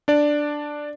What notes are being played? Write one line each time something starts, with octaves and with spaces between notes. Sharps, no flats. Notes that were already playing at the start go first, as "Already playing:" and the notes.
D4 D5